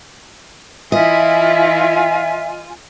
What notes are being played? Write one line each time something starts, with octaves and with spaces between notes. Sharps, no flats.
E3 E4 F4 D#5 E5 G#5